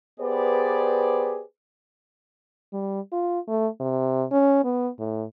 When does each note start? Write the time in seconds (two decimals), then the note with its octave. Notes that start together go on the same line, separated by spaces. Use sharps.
0.19 B3 G4 G#4 B4 C5 D5
2.73 G3
3.12 F4
3.48 A3
3.80 C3
4.32 C#4
4.64 B3
4.99 A2